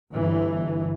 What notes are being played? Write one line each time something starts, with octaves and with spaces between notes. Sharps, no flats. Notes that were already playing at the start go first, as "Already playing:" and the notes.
G1 E3